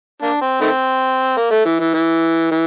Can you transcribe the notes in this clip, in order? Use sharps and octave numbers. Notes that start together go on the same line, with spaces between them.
A#3 D4
C4
D#3 A3 C4
A#3
A3
E3
E3
E3
E3